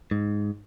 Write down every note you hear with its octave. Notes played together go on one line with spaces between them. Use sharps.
G#2